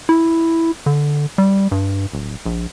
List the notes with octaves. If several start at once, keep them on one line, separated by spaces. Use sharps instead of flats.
E4
D3
G3
G2
D1
A#1